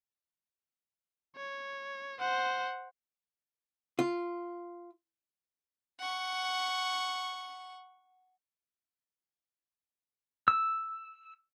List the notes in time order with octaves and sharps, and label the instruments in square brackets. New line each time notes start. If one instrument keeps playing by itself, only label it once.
[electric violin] C#5
C5 F#5
[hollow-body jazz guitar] F4
[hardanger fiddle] F#5 C#6
[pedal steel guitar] E6